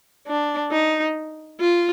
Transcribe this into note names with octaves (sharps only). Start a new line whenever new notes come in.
D4
D#4
F4